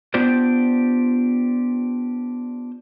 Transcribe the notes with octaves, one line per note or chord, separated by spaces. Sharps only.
B3 D4 F4 G4 C5 D5